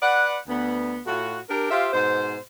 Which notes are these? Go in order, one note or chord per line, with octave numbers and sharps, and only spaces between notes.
B4 D5 F#5
D2 D3 B3
A2 F4 F#4
D4 G4 A#4
F4 G4 C5 E5 F5
G#2 B2 C5